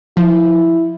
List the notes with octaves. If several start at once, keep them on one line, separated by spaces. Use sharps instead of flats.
F3 E4